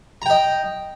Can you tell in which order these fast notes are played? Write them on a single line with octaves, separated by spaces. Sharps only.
A#5 G5 D#5